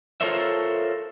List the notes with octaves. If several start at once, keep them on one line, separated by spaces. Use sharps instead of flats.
F4 A4 A#4 C5 C#5 E5